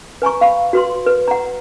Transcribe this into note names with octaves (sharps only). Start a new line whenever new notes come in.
B4 G#5 A#5 C#6
F5 B5 C#6
F#4 B4 C6
B4
F#5 A#5